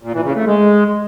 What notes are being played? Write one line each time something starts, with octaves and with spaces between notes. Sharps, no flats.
A#2
E3
C#3
A3
G#3